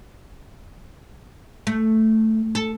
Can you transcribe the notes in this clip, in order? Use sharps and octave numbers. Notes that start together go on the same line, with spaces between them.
A3
A4